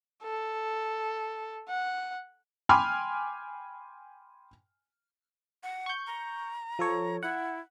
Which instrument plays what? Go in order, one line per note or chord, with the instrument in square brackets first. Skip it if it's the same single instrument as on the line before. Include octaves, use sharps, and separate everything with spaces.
[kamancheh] A4
F#5
[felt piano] G5 G#5 B5 C6 D6 F6
[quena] F#5
[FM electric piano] C#6 G6
[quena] A#5
[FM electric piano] F3 A4 C#5
[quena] E4 [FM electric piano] F#5